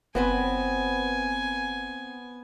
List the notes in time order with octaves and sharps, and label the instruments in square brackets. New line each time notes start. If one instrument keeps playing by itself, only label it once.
[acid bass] F#1 [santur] B3 [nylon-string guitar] C4 B4 C5 [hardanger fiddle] G#5